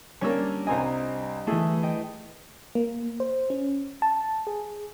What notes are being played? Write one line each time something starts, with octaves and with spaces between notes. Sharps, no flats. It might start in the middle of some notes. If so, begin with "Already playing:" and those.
G3 A#3 C#4 D4 E6
C2 C4 D#5 G#5 A#5
E3 A3 E4 G#4
D#5 G5
A#3
C5
C#4
A5
G#4